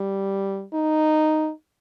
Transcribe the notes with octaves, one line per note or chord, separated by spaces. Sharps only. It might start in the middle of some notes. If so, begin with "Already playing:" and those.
Already playing: G3
D#4